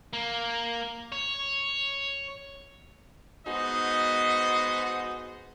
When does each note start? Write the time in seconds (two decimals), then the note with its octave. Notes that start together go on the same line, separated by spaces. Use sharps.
0.13 A#3
1.12 C#5
3.47 G#3 B3 D#4 F#4 C5 D#5